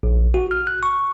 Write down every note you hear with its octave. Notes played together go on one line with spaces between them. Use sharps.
A#1
F#4
F6
F#6
C#6